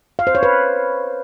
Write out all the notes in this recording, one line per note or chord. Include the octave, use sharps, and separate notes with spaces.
F5
C5
C#5
B4